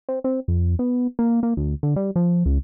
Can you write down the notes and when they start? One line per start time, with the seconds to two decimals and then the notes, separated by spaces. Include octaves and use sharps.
0.09 C4
0.24 C4
0.48 F2
0.79 B3
1.19 A#3
1.43 A#3
1.57 D2
1.83 D3
1.96 G3
2.16 F3
2.46 C#2